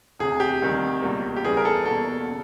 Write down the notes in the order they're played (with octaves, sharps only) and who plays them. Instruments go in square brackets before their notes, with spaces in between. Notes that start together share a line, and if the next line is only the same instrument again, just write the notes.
[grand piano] E1 D2 C3 G#4
G4
D2 C3 D#3 G3
C#2 B2 G3 A#3
G4
E2 C#3 E3 G3 G#4
A#4
A4
E2 B2 G3 A#3 A4
C#3